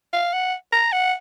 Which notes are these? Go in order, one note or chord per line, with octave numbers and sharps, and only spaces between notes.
F5
F#5
A#5
F#5